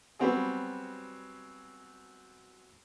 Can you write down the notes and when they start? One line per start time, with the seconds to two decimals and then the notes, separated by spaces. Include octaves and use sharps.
0.19 F#3 G3 B3 C4 F#4 G#4